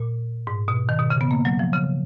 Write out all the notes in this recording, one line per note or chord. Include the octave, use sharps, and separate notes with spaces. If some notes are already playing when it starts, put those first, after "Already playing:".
Already playing: A#2
G#2
B2
D#3
B2
C#3
B3
A#3
F#3
F3
C#3